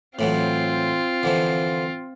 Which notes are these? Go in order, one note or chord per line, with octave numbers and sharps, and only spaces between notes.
A2 E3 F#3 C4 F4
D3 E3 F3